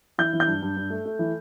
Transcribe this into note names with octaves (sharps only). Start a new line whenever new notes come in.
E3 G6
E3
G6
G2
G2
G2
A3
A3
E3